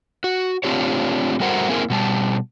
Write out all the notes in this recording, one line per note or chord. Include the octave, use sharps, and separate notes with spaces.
F#4
A3 C4 D4 F4 G4 C#5
G3 A3 F#4 A#4 C5 F#5
A#3 C4 E4 G#4 A#4
B2 G3 A5